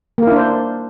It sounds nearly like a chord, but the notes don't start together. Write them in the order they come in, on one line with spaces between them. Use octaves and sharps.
A#3 A#4 E4 D4 C5